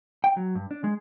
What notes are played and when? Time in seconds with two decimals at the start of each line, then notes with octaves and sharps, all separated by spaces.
0.24 G5
0.37 F#3
0.55 G2
0.71 D4
0.84 G#3